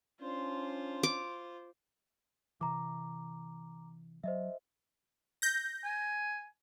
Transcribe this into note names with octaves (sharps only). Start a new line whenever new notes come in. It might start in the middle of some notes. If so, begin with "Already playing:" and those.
C#4 D4 F4 C5
D6
C3 E3 A#5 D6
F#3 C5 D#5 E5
G6 A#6
G#5